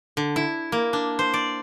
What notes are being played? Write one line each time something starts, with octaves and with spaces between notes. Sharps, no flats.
D3
E4
A#3
D4
C5
D5